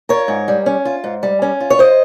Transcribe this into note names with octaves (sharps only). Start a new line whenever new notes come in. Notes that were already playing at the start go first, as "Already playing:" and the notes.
F4 A#4 C#5
G#2
G3
C#4
F4
G#2
G3
C#4
F4
C#5
C5 D#5